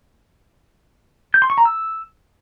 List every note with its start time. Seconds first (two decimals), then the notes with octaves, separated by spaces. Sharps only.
1.34 G6
1.42 C6
1.50 C#6
1.58 A#5
1.65 E6